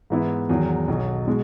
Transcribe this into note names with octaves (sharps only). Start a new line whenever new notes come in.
G#2 E3 B3 E4
E2 D#3 F#3
B1 B2 F#3
B2 G#3